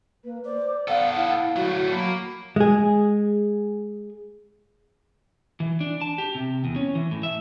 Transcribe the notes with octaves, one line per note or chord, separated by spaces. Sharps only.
A#3 B4
C5 D5 D6
B3 A4 F5 F#5
E4 F5
F#3 A3 F#4
F#3 A#3 B5
G#3 G#4
E3
D4
A5
G4
C3
E2
C#4
E3
A2
E5